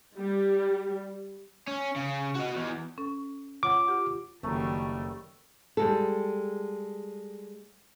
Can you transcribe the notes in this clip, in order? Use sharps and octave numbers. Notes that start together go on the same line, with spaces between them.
G3
C#4
C#3
F#4 D#5
E2
C#4 A4 C#6
F4 C#5 F#5 D6
F4 G4 F#5
F#1 D#3 G3 A3 C#4 F#4 A#4
G3 G#3 A4